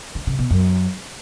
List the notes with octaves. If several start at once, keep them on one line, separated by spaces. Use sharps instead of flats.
D3
C#3
B2
F#2